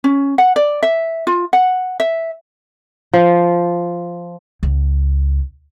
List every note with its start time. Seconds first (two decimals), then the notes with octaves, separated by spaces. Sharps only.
0.04 C#4
0.38 F#5
0.56 D5
0.83 E5
1.27 F4
1.53 F#5
2.00 E5
3.13 F3
4.63 C#2